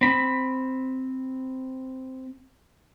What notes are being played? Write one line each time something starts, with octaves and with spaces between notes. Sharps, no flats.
C4 B5